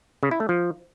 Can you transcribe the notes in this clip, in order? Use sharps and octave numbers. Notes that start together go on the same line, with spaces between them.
C#3
E4
A3
F3